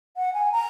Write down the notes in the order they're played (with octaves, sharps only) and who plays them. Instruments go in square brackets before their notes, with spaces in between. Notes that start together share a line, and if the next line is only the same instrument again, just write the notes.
[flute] F#5
G#5
A#5